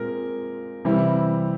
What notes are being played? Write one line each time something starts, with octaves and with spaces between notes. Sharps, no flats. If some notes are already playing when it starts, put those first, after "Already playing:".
Already playing: A#2 G#3 C4 A#4
C3 E3 G3 C4 E4